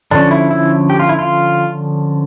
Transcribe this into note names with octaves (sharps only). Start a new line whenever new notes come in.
D3 F3 C#4 D4
E4
E4
G4
F4
E4
F4